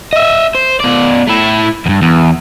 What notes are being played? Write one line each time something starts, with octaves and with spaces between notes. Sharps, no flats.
D#5 E5
C5
B2 D5
A3 E4
E2 G2
E2